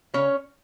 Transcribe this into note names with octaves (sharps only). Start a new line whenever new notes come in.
C#3 C#4 C#5